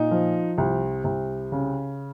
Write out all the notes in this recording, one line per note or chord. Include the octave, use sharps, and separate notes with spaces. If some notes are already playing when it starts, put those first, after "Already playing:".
Already playing: A#2 D#4
F3
C2
C2
C#3